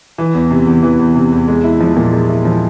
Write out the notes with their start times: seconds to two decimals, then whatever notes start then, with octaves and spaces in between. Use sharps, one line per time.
0.18 E3
0.34 E2
0.51 C3
0.67 E2
0.83 E3
0.99 E2
1.16 C3
1.32 E2
1.48 G#3
1.64 E4
1.80 F3
1.97 A#2
2.13 G#3
2.29 E4
2.45 F3